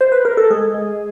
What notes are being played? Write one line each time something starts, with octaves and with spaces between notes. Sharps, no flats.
C5
B4
A#4
A4
G#3 G#4
G#3